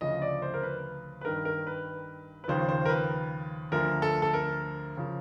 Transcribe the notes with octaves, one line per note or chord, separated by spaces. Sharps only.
D2 C#3 F3 D#5
D5
C5
A#4
B4
B4
G2 D#3 A#4
A#4
B4
B4
D#2 C#3 F3 C5
C5
A#4
B4
D2 D3 F3 A#4
A4
A4
A#4
C#3 F3